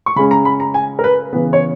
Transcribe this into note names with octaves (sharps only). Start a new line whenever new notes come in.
C#6
C#3 G#3 C#4 B5
A#5
B5
A#5
G#5
A#4
B4
C#3 E3 B3 B4
C#5